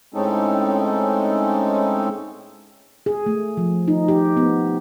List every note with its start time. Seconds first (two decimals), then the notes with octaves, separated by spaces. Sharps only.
0.14 A2 G#3 C4 C#4 D#4 A4
3.06 G#4
3.26 A3
3.57 F3
3.88 D#4
4.08 G4
4.37 B3